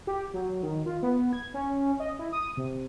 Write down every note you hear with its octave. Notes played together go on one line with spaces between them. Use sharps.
G4
F#3
D#3
F4
B3
G#6
C#4
D#5
E4
D#6
C3